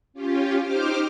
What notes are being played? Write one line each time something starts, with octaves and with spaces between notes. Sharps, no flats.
C#4 F4 G4
D#4 G4 C5 D6 F6